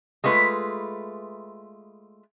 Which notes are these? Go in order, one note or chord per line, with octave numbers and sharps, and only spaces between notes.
G#3 A3 F4 B4